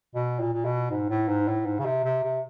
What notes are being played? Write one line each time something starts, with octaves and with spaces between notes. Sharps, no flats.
B2
A#2
A#2
B2
G#2
A2
G#2
A2
G#2
C#3
C3
C3
C3